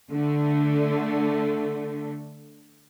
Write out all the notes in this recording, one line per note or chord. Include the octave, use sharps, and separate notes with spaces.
D3 A3